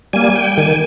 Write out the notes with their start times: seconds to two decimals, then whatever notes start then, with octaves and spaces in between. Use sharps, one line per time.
0.13 G3 A#3 G#5
0.35 G5
0.58 D#3 G#5